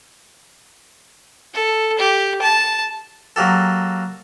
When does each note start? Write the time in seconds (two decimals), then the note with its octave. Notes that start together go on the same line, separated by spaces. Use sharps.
1.54 A4
1.99 G4
2.41 A5
3.36 F#3 A#3 G4 A4